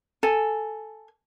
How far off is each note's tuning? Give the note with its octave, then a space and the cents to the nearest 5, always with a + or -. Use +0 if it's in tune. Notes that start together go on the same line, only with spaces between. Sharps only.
A4 +0 G#5 +0